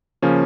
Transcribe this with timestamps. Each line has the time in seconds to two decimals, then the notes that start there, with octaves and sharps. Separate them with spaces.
0.22 C#3 F3 A#3 C#4